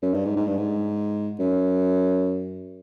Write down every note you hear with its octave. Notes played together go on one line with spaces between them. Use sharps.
F#2
G2
G#2
G#2
G2
G#2
F#2